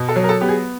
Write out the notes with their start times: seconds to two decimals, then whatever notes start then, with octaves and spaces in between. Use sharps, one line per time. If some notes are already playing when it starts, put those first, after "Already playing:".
Already playing: B2
0.09 A4
0.16 F#3
0.24 A#4
0.29 A4
0.41 B3 G4
0.49 G#4